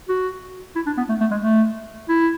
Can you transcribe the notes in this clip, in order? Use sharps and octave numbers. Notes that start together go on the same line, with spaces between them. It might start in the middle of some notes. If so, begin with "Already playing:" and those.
F#4
E4
D4
B3
A3
A3
G#3
A3
E4